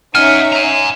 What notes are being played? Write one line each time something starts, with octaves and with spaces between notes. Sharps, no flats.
C#4 D#4 E5 F#5 G#5 F6
G#5 A#5